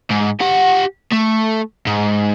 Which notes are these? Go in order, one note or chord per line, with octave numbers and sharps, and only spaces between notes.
G#2
G4 F#5
A3
G#2